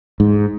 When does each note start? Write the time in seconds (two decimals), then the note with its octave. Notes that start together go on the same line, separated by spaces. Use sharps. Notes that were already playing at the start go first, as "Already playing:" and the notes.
0.20 G#2